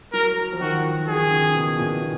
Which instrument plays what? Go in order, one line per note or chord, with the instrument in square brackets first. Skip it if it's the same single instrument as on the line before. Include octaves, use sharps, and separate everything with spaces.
[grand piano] F#3 [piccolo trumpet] A#4
[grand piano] F3
[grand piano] D#3 [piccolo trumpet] F#4
[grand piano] D#3 [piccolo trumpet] G#4
[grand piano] C#3
B2
A#2